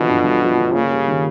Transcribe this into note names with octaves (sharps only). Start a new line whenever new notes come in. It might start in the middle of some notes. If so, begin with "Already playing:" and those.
Already playing: B2 D3 E3 F3
G2
G1
F3
D3
C#3 A#3
G3
D#3